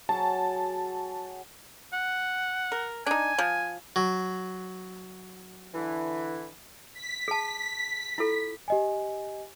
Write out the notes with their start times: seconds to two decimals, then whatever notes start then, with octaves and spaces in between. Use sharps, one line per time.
0.09 F#3 G#4 A5
1.93 F#5
2.72 A#4
3.07 D4 D#4 G#5
3.38 F3
3.96 F#3
5.74 D3 E3
6.94 B6
7.28 G#4 A5
8.18 E4 F4 A4
8.68 G4 D#5 G#5